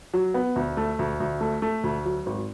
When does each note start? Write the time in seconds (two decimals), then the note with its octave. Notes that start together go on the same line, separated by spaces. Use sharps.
0.14 F#3
0.34 B3
0.56 D2
0.77 A3
0.99 D2
1.20 D2
1.41 A3
1.62 A3
1.83 D2
2.05 F#3
2.26 G#1